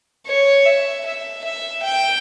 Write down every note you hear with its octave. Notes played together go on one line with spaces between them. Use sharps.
C#5
E5
E5
E5
G5